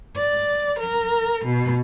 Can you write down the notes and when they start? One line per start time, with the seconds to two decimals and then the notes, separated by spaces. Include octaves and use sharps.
0.16 D5
0.78 A#4
1.43 B2